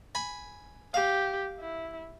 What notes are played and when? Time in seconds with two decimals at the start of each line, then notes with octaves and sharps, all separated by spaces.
0.15 G#5 B5
0.94 G4 F5
1.60 E4